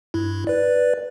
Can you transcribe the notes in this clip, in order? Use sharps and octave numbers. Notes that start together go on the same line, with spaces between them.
G2 E4
B4 D5